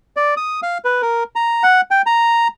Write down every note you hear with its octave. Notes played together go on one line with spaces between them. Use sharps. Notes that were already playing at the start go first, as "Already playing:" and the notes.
D5
D#6
F5
B4
A#4
A#5
F#5
G5
A#5